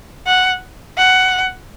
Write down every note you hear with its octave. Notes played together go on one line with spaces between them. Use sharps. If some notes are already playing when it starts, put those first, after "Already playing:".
F#5
F#5